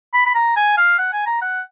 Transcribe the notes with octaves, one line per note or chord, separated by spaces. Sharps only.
B5
B5
A#5
G#5
F5
F#5
G#5
A#5
F#5